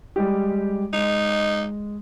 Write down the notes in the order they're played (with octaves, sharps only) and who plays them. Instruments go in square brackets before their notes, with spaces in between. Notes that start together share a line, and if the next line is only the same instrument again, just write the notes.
[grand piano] G3 G#3 G4
[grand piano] G#3 [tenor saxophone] D#4